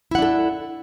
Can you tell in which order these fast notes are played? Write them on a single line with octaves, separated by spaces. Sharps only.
E4 F#5 D4 A4